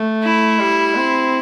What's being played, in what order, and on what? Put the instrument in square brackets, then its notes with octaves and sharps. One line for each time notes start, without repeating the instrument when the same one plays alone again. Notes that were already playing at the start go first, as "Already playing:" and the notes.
Already playing: [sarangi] A3
[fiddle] E4
[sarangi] G3
C4